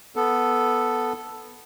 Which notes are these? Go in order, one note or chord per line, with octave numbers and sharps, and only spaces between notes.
B3 A4